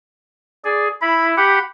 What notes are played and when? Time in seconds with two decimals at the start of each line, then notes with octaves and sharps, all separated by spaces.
0.65 G#4 D5
1.02 E4 B5
1.37 G4 F#5 B5